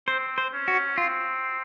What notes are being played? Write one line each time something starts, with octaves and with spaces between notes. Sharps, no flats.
C4 C5
C5
C#4
F#4
C4 F4